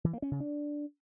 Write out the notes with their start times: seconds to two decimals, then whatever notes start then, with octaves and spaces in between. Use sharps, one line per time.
0.04 E3
0.13 A#3
0.22 C#4
0.31 C#3
0.40 D4